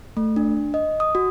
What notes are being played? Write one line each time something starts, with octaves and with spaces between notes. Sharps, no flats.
A3
D4
D#5
D#6
F#4